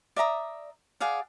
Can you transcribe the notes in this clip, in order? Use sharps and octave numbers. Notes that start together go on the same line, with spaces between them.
D5 E5 A#5 D#6
G#4 D5 F5 F#5